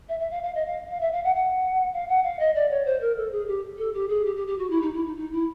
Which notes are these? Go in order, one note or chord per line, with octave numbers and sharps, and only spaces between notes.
E5
E5
F5
F5
D#5
F5
F5
E5
F5
F#5
F#5
F5
F#5
F5
D#5
D5
C#5
C5
A#4
A4
G#4
G4
A4
G4
G#4
G4
G4
G4
F#4
E4
D#4
E4
D#4
D#4
E4